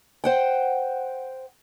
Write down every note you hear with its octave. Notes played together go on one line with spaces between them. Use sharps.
C5 F#5 G5